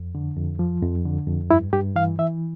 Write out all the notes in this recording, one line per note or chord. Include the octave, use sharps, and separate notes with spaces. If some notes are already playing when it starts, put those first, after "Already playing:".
Already playing: F2
D3
F2
F3
F2
D3
F2
G2 E4
G2 G4
E3 F5
E3 E5